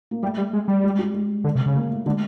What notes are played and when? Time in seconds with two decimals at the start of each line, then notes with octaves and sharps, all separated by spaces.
0.11 A#3
0.22 G3 A3
0.38 G3
0.53 G#3
0.68 G3
0.84 G#3
0.99 G3
1.14 G#3
1.44 D3
1.55 C3
1.66 C#3
1.75 A#3
1.91 A3
2.06 D3 G#3